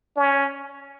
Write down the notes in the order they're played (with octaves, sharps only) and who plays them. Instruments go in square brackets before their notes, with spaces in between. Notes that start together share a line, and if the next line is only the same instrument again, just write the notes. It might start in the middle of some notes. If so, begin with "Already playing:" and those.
[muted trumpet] C#4